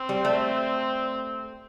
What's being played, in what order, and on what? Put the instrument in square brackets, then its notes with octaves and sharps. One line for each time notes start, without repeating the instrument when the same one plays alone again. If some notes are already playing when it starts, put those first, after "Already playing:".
Already playing: [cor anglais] C4
[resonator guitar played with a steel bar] G3
A3